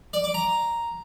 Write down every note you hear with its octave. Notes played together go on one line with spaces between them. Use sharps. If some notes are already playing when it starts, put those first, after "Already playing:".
D5
D6
A#5